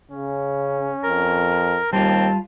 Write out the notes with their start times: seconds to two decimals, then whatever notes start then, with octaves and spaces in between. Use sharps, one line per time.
0.11 C#3 C#4
1.04 F2 A#4
1.93 D#2 G3 C4 F4 A5